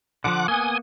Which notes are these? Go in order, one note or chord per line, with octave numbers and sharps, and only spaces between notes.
D3 E3 F3 F#5 D6
A#3 B3 G#5 D#6